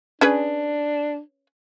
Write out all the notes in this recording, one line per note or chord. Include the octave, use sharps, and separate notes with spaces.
C#4 D4 G#4 B4